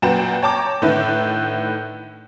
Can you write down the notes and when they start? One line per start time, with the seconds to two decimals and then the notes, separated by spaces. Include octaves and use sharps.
0.02 F#2 A#2 F#4 B4 G5 E7
0.42 C#5 G5 A5 A#5 D6
0.82 A2 D3 D#3 E4 B4